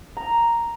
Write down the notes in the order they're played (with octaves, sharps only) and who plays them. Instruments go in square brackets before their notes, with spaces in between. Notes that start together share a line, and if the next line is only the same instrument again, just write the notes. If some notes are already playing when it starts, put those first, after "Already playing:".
[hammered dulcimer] A#5